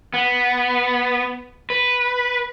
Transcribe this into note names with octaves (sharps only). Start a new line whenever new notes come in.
B3
B4